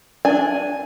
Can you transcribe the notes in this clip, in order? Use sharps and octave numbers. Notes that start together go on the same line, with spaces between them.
D4 G#5